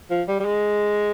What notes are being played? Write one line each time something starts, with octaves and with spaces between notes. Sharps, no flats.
F3
G3
G3
G#3